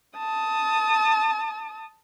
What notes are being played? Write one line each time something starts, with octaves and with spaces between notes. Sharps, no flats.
A5 D#6